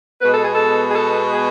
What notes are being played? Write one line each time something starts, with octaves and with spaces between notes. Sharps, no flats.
B2 G#3 B3 B4
A4
G#4
A4
G#4
A4
G#4